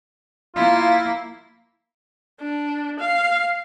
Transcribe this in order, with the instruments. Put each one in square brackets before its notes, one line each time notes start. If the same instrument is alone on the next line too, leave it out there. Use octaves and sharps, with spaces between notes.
[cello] A#3 E4 [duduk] F4
[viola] D4
F5